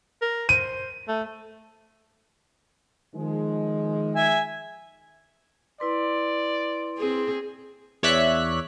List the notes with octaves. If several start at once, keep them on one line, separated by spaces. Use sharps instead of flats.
A#4
C5 D#7
A3
D#3 F3 G#3
E5 G#5
E4 B4 D5 C6
C4 G#4
E2 C#5 D5 E5 F#6 B6